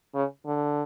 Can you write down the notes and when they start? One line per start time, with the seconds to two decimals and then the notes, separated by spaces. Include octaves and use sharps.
0.15 C#3
0.46 D3